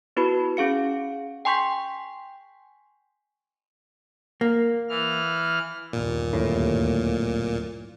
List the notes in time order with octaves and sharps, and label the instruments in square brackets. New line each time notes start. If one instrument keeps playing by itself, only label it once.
[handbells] B3 E4 F#4 B4 B5
C#4 G#4 F5 C#7
G5 G#5 C6 C#6 G6 B6
[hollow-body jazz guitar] A#3
[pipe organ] E3 F6
[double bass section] G1 D#2 [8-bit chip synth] A#2
[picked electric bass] D1 A2